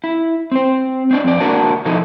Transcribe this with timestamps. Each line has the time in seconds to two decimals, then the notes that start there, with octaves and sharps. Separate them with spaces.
0.04 E4
0.52 C4 C5
1.11 C4 D4 D5
1.24 F2 D5
1.40 A#3 D4 F#4 A#4 D5 A5
1.85 B2 E3 F3 D#4 A4